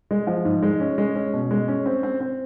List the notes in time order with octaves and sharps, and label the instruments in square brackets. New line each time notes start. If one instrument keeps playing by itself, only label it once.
[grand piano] G#3
F3
G#2
G#3
C#4
G#3
C#4
B2
G#3
C#4
C4
C4
C4